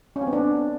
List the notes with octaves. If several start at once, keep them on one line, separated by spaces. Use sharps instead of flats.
C#4
C4
B3
D4